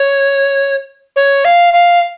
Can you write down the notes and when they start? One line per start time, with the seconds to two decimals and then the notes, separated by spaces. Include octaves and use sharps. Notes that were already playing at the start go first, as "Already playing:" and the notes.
Already playing: C#5
1.16 C#5
1.45 F5
1.73 F5